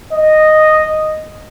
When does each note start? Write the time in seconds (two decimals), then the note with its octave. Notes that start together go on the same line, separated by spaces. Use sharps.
0.13 D#5